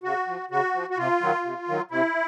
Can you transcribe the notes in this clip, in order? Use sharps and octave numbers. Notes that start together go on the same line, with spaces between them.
C#3 F#4
F3
C#3 F#4
F3
F#4
C3 F4
D#3 F#3
C3
D#3 F#3
C3 E4